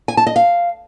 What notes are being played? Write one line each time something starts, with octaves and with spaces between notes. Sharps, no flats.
G#5
A5
D#5
F5